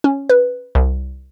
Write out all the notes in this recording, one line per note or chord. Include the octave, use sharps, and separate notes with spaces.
C#4
B4
C2